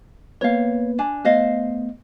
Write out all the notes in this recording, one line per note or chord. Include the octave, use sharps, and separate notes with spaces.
A#3 B3 B4 C#5 F5
D4 G#5
A3 B3 C5 D#5 F5